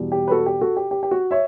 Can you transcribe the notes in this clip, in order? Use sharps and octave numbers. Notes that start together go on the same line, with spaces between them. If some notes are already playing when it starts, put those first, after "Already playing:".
Already playing: E2 B2 G3
G4
B4
F#4 A4
G4
F#4 A4
G4
G4
G4
F#4
C#5 E5